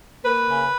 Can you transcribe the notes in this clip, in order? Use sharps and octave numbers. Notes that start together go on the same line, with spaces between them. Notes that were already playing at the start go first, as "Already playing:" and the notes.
A#3 B4
C#3